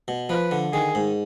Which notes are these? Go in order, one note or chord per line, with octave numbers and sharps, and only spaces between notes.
B2
F3 B4
D3
D#3 G#4
G#2